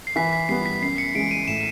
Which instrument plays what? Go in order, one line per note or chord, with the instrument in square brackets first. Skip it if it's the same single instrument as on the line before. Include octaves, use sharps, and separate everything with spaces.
[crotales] C7
[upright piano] E3 [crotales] B6
[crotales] B6
[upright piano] G3 B3 [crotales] C7
[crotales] B6
[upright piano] F#2 [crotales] C7
[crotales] C#7
[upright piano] C#3 E3 G#3 [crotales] D7
[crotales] D#7
[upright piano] A2 [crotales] E7